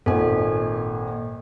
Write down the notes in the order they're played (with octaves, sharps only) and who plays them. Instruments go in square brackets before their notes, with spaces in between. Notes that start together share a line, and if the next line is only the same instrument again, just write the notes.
[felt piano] G#1 A#2 G#5 [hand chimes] A4